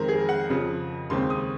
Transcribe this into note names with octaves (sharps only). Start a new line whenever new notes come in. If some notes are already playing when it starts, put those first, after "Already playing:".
Already playing: F2 D#3 G#3 C4 A#4
G#4
F#5
F2 C#3 F3
D#2 C#3 G#3 C4 C6
D#6